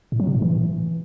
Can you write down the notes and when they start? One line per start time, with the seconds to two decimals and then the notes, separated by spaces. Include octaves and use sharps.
0.12 A2
0.20 F#3
0.27 C3
0.35 A2
0.42 E3